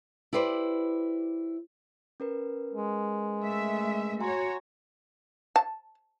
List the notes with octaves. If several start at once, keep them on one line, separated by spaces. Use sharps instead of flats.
E4 G4 B4 C5 D5
C#4 A#4 B4
G#3
A3 E5
F#4 C#5 G#5 A#5 C6
A5